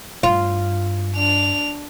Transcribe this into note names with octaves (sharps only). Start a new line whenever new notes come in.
G2 F4
D4 F7